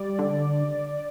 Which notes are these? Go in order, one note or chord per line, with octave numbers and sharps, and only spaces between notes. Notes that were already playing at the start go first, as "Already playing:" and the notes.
Already playing: G3 D5
D3